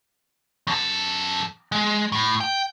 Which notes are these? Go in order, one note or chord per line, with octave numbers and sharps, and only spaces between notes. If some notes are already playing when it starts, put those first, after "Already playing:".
F#2 A4
G#3
A2
G5